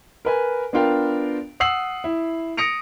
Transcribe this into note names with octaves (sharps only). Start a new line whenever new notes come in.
A#4 B4 G#5
B3 D4 F4 A#4 F5 G5
F#5 D#6 E6 C7 F#7
E4
D#6 A#6 C#7 D7 F7